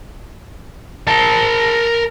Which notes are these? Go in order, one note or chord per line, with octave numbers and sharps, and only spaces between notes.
A#4 A5